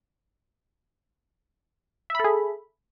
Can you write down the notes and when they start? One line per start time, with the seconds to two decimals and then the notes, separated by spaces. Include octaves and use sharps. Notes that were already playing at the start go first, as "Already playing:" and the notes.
2.10 E5
2.15 B5
2.20 A4
2.24 G#4